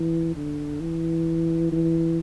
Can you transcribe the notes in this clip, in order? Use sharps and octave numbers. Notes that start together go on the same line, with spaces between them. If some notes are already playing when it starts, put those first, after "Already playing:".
Already playing: E3
D3
E3
E3